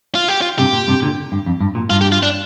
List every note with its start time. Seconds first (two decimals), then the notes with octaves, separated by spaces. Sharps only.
0.15 F4
0.28 G4
0.42 F4
0.58 G2 C3 G4
0.73 A#2
0.87 G2 C3
1.02 A#2 D3
1.32 G2
1.46 F2
1.61 G2
1.75 A#2
1.90 G2 F4
2.01 G4
2.12 F4
2.23 D4